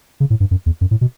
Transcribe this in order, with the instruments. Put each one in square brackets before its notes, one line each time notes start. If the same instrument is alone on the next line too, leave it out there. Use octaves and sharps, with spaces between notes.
[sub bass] C#3
A2
G2
F#2
E2
F#2
A2
B2